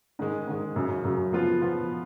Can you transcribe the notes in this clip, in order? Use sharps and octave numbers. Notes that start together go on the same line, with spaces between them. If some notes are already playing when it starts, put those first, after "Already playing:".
G#2 D#3 G#3
G#2 D#3 G#3
F#2 C#3 F#3
F#2 C#3 F#3
F3 B3 F4
F3 B3 F4